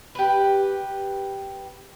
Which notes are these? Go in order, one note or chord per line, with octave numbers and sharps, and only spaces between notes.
G4 B4